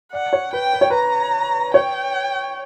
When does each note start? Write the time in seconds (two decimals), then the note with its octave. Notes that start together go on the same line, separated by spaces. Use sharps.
0.13 D5 F#5
0.33 C#5
0.53 B4 G5
0.73 B4
0.81 C#5
0.90 B4 A#5
1.74 C#5 G5